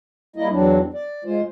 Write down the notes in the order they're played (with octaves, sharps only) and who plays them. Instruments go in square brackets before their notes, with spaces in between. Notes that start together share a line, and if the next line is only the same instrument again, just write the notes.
[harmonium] G3 A#3 E4 D#5
E2 F#3 C4 D4
D5
G#3 F4 C5